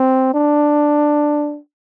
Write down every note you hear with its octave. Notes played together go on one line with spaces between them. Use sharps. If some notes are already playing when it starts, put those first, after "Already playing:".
Already playing: C4
D4